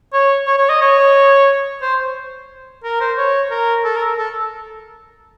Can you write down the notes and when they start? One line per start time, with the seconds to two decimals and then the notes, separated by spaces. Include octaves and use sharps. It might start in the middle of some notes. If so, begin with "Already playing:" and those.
0.13 C#5
0.47 C#5
0.58 C#5
0.69 D#5
0.81 C#5
1.82 C5
2.84 A#4
3.01 C5
3.18 C#5
3.51 A#4
3.84 A4
3.96 A#4
4.18 A4